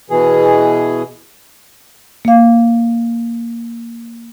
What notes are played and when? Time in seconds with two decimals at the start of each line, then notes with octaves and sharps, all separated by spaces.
0.10 B2 E3 G#4
2.25 A#3 F5